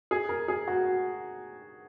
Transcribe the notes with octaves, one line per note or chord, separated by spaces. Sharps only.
G#4
A#4
G#4
F#4